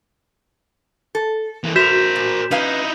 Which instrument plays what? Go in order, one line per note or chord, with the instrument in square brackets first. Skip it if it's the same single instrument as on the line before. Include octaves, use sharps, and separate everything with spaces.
[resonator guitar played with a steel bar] A4
[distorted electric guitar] E3 A#3
[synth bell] F#4 [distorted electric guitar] A#4 C5 [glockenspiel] G6 B6 E7
[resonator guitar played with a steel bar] A#2
[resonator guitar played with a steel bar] C#4 B4 F5 [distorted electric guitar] D#4 E4